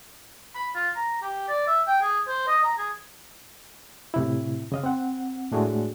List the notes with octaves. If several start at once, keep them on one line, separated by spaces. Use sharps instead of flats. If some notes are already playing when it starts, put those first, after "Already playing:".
B5
F4
A#5
G4
D5
E5
G5
G#4
C5
D#5
A#5
G#4
A2 C3 E4
C#3 D#5 F5
C4 F#5
A2 G#3 A3 D4 F#4 G#4